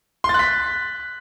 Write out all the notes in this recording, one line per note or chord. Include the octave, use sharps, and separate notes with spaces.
C6
A6
F#6
B6